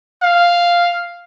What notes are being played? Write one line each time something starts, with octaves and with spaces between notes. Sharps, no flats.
F5